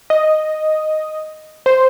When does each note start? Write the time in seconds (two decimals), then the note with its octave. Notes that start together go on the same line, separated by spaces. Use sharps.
0.10 D#5
1.66 C5